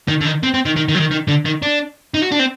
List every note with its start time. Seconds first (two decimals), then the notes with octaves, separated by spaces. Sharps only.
0.08 D#3
0.21 D3
0.25 D#3
0.43 C4
0.54 C4
0.65 D#3
0.76 D#3
0.89 D#3
0.95 F#3
1.00 D#3
1.11 D#3
1.29 D3
1.46 D#3
1.62 D4
2.14 D#4
2.22 F#4
2.31 D4
2.39 C4